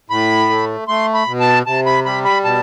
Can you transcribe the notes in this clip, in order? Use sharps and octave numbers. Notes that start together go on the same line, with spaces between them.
A2 B5
A3
A3 C6
B5
B2
A5
C3 A5
B5
G3 B5
B5
B2 A5